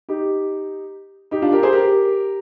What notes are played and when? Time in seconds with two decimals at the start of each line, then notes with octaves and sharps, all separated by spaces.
0.09 D#4 G4
1.31 D#4 G4
1.42 D4 F4
1.52 G4 A#4
1.63 G#4 C5
1.72 G4 A#4